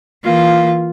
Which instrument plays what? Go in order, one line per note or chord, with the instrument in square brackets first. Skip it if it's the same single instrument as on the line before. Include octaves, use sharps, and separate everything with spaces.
[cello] E3 A#3 [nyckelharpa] F4 F5